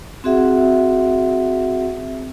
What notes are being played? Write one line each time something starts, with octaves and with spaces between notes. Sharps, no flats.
C4 F#4 G#4 E5 F#5